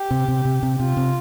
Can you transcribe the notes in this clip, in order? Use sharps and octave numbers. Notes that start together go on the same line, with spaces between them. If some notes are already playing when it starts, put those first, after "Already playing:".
Already playing: G4
C3
C3
C3
C3
C3 F4
C3